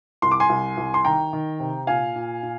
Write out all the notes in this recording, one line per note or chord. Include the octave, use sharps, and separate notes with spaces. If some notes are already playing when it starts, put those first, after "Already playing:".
C2 C6
D6
G#5 C6
C2
C2
C6
D#3 G5 A#5
D#3
C3
A#2 F5 G#5
A#2
A#2